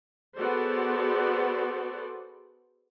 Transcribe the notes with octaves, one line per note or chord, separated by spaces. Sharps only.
B3 F#4 G#4 A4 C5 D5